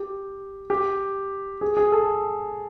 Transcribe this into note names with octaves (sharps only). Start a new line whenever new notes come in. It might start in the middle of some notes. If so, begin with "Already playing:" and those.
Already playing: G4
G4
G#4
G#4
A4